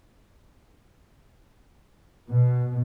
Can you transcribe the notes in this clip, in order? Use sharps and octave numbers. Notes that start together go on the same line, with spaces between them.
B2